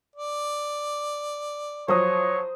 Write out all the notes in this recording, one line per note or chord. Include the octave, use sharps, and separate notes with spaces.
D5
F3 F#3 C5 C#5 D#6